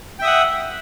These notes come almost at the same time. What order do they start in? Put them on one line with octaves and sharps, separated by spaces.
G5 E5 D#6 F#5